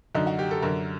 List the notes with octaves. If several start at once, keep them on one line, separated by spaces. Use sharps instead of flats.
F#2 D3 D#4
F#4
G4
A4
F#2 D3 A#4